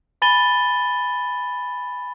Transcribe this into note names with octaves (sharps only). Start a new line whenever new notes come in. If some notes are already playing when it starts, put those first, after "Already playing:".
G#5 B5 A6 D#7 G7